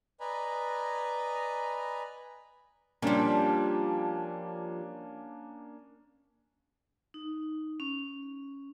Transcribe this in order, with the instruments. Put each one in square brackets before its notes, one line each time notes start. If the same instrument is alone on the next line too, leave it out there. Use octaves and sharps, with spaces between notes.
[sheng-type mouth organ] B4 D5 D#5 G#5 A#5 B5
[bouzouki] F3 G3 [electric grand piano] A#3 C#4 D4
[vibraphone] D#4
C#4